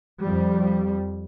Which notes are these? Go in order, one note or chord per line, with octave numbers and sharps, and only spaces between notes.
F2 G3